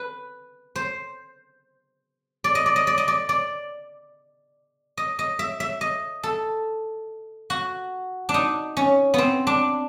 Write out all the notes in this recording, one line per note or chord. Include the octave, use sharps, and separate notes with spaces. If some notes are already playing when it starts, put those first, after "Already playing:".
Already playing: B4
C5
D5
D#5
D5
D#5
D5
D#5
D5
D5
D#5
D#5
E5
E5
D#5
A4
F#4
D4
D#4
C#4
B3 C4
D4